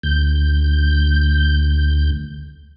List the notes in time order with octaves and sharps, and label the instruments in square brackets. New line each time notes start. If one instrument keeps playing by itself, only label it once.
[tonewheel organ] D2 G6